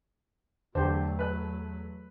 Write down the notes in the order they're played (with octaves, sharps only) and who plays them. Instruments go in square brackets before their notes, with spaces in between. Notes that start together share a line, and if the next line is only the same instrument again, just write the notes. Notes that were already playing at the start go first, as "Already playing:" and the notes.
[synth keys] E2 [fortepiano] D3 [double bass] F#3 A3 [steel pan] G4 C5
[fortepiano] B4 F#6